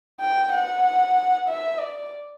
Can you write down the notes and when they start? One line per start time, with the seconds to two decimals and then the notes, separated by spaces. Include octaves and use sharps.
0.20 G5
0.52 F#5
1.48 E5
1.79 D5